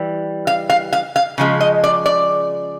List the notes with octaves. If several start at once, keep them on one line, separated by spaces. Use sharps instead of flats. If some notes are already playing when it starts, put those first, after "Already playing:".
Already playing: E3 G3
F5
F5
F5
F5
C#3 F3 G#3
D#5
D5
D5